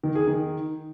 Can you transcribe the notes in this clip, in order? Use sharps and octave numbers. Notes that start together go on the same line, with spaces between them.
D#3
G#4
D#3